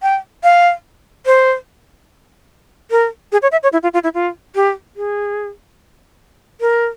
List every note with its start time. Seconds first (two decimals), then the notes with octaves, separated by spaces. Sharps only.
0.02 G5
0.44 F5
1.26 C5
2.91 A#4
3.32 G#4
3.42 C#5
3.52 E5
3.63 C#5
3.73 E4
3.83 F4
3.94 F4
4.04 E4
4.14 F4
4.55 G4
4.96 G#4
6.61 A#4